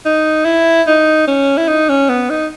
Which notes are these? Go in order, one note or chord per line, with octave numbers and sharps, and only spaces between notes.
D#4
E4
D#4
C#4
E4
D#4
C#4
B3
D#4